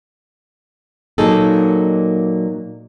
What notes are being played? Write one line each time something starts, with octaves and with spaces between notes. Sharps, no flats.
A#2 F#3 A#3 D#4 G#4 A4